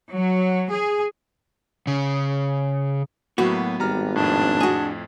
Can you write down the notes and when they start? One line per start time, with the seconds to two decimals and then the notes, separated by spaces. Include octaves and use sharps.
0.14 F#3
0.73 G#4
1.87 C#3
3.38 A2 F#3 A#3 B3 F#4
3.80 G#1 G3 A#5 F6
4.16 F2 A2 D4
4.60 F#4 G#4